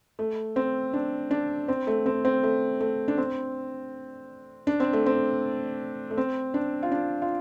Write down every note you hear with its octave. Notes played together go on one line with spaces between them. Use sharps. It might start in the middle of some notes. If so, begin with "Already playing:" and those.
A3
C4
D4
D4
C4
A3
C4
C4
A3
A3
D4
C4
D4
C4
A3
C4
A3
C4
D4
F4
D4
F4